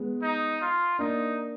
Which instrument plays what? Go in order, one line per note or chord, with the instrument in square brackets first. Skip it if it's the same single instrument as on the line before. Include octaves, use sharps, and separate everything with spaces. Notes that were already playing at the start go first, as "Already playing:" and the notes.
Already playing: [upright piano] G#3 B3
[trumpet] D#4
F4
[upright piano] A#3 D4 [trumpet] D#4